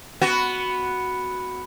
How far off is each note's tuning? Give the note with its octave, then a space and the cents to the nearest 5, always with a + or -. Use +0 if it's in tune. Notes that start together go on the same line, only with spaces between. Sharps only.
B3 +0 F#4 +0